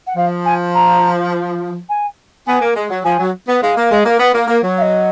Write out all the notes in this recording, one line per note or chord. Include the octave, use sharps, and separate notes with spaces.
F#5
F3 F5
G#5
A#5
G#5
B3 G#5
A#3
G#3
F#3
F3 G#5
F#3
B3
G#3 F5
A#3
G#3
A#3
B3
A#3
A#3
F#3
F5
D#5